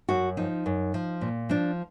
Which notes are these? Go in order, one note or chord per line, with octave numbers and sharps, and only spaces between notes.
F#2 F#4
F3 D#4
F#2
F3
A#2
F3 D4